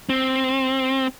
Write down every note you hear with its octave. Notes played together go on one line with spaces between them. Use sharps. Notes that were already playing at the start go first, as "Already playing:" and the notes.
C4